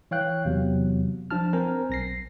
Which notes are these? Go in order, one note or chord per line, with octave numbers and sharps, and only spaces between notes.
E3 C#5 F5 G5 F#6
E2 C3 F#3
F3 D4 F4 A5 F6
C4 A#4 C5 G#5 A#5
B1 A#6 C7